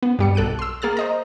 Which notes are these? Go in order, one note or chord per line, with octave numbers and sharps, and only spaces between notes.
B3
G2 G3 C#7
B1 A4 F#6 D7 D#7
C6 E6
A#3 G#4 F6 A6
C5 D#5 A#5